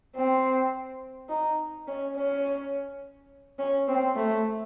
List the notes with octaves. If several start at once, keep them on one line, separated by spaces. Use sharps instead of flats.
C4
D#4
C#4
C#4
C#4
C4
A3